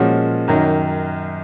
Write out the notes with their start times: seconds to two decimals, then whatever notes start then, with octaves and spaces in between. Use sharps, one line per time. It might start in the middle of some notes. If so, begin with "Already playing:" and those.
Already playing: A#2 F3 G#3 C#4 F#4
0.48 F#2 D#3 F#3